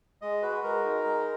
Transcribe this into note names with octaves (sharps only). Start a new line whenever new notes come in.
G#3 D#5
F#4 B4
G#3 A#4
D#4
G#3